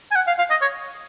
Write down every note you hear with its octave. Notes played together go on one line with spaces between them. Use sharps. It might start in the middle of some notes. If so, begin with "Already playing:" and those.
G#5
F#5
F5
F5
D#5
C#5